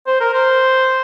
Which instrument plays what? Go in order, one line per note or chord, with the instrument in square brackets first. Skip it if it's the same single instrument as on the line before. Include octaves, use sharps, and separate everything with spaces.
[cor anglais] C5
A#4
C5